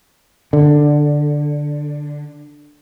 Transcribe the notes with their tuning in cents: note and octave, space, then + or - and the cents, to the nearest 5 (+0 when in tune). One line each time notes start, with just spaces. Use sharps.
D3 +5